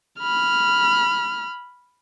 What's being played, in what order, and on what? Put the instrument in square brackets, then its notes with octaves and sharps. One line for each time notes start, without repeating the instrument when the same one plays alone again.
[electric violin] B5 F6